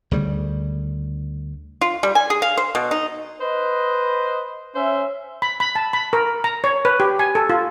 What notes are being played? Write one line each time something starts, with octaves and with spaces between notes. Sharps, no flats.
D2 C#3 G3
F4
G3
G#5
G#4
F5
C5
B2
D#4
B4 C5 D#5
C#4 C5 E5
B5
B5
A5
B5
A#4
A#5
C#5
B4
G4
G#5
A4
F4